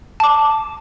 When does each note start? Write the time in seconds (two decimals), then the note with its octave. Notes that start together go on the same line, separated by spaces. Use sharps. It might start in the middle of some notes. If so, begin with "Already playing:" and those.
0.20 A5 D6